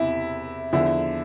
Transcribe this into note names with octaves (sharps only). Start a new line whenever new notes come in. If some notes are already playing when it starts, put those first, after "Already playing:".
Already playing: E2 C3 E4
E2 D3 F3 E4